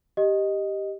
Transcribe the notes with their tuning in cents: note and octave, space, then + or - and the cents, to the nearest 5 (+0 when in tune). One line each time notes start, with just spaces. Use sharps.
G4 +0 D#5 +0